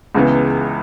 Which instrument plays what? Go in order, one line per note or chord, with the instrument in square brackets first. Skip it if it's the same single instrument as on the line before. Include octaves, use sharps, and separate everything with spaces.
[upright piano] C#2 C#3 E3 B3